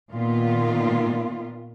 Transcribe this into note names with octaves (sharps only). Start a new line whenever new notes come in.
A#2 D#3 B3 F4